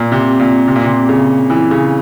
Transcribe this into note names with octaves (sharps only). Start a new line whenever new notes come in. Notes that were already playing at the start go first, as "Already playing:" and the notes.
Already playing: A#2
C3
A#2
C3
A#2
C3
C#3
E3
C#3